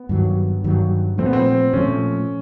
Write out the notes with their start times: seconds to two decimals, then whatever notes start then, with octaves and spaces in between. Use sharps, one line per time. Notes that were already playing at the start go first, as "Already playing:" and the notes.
Already playing: B3
0.09 G2 D#3 F#3
0.64 G2 D#3 F#3
1.18 A#2 F3 A3 C4
1.26 B3
1.33 C4
1.73 A#2 F3 A3 C#4